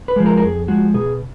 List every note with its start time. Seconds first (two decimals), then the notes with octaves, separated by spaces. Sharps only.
0.08 B4
0.16 F3 G#3
0.26 A#4
0.38 A#4
0.42 F2 G#4
0.68 F3 G#3 F#4
0.94 B2 G#4